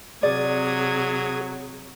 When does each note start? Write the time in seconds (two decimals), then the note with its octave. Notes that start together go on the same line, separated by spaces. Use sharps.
0.23 C3 F#3 G#4 D5 D#6 G#6